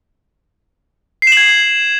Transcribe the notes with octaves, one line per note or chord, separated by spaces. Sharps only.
G#6 C7 E7 F#7